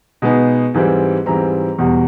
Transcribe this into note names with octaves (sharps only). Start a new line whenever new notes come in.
B2 G#3 B3 D#4
G#2 E3 G3 C4
G#2 E3 G3 C4 A#5
E2 B2 G3